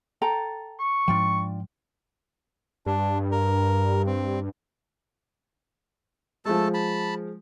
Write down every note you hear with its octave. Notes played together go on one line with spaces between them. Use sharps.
A4 G5 A#5
C#6
G#2 F3 D4 F4 G5
G2 D4
A#4
C4
F3 G#3 A3 A4 A5
A5 B5